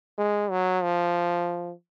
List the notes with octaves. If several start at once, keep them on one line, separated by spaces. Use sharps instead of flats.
G#3
F#3
F3